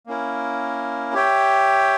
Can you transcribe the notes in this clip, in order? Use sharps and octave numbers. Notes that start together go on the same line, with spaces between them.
A#3 C#4 E4 A#4
G4 C#5 E5 G5